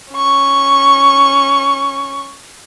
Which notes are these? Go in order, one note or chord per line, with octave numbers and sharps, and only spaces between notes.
C#4 C#6